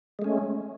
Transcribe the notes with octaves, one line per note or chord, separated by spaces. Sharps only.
G#3 A3 C#4